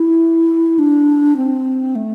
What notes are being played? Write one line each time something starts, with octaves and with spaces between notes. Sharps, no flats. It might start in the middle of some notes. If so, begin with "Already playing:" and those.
Already playing: E4
D4
C4
A3